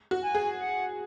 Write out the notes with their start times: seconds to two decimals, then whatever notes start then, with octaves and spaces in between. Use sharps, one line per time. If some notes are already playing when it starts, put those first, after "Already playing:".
0.11 F#4
0.23 G#5
0.35 G#4
0.60 F#5